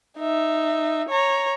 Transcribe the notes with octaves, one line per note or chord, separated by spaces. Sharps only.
D#4 E5
C#5 A#5